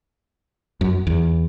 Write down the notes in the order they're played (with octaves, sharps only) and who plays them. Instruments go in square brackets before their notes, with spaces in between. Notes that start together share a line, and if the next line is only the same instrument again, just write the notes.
[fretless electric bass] F#2
E2